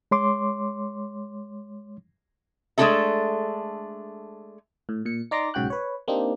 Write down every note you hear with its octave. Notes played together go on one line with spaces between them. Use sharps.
G#3 C#5 C6 D6
G#3 A3 D4 F#4 A4 E5
A2
A#2 C#7
D#4 D5 A#5 C6 D6 A#6
B1 G#2 C#3 F#4 G5 F#6
B4 C#5
A#3 C4 D4 D#4 G4